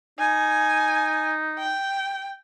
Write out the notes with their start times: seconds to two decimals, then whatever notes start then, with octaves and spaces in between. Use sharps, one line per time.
0.19 D#4 G#5
1.59 G5